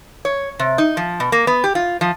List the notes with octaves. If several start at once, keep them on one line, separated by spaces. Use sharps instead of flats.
C#5
C3
D#4
F3
B2
A#3
B3
G4
F4
F3